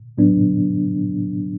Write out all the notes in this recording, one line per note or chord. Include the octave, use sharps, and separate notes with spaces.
A2 F#3 B3 D4